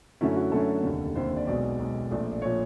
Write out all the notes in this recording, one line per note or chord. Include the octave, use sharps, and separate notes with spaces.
F#2 D3 F#3 A3 C#4 E4
F#4
F#2 D3 F#3 A3 C#4 A4
F1 D#2 D3
F1 D#2 D3 C5
D5
B1 B2 G#3 D5
B1 B2 G#3
A#1 A#2 F3 A3
A#2 F3 A3 C#5